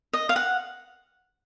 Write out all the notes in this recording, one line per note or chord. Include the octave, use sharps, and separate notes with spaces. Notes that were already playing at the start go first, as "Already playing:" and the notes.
D#5
F5
F#5